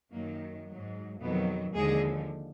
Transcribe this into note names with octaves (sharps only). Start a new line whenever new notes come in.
F#2 D#3 F#3 A#3
G#2 F#3
F2 B2 D#3 F#3 B3
D#2 D3 F3 G#3 G#4